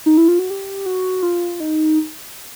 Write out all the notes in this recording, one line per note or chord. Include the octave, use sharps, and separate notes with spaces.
D#4
E4
F4
F#4
G4
F#4
F4
D#4